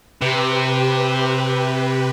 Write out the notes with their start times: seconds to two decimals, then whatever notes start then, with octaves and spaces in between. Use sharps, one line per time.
0.21 C3 G4 B4